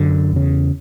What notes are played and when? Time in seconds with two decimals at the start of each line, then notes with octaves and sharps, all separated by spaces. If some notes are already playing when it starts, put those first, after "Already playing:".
Already playing: F#2 D3
0.33 E2 C#3